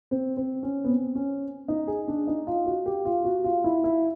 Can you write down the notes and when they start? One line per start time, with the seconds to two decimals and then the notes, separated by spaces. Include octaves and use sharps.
0.11 C4
0.37 C4
0.63 C#4
0.84 B3
0.89 C4
1.15 C#4
1.68 D#4
1.87 G#4
2.08 D4
2.27 D#4
2.47 F4
2.66 F#4
2.86 G4
3.05 F4
3.25 F#4
3.44 F4
3.64 E4
3.84 E4